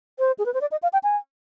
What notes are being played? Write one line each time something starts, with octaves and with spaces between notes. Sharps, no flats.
C5
G#4
B4
C5
D5
D#5
F5
G5
G#5